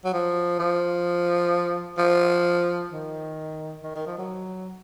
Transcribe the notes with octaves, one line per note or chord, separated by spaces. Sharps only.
F#3
F3
F3
F3
D#3
D#3
D#3
F3
F#3